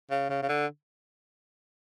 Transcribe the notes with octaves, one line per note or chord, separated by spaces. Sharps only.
C#3
C#3
C#3
D3